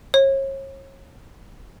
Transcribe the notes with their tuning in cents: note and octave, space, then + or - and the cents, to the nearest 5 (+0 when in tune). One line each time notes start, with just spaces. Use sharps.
C#5 -35